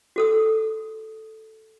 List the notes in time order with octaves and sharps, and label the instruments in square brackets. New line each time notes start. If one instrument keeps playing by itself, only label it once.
[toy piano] F#4 A4 D#6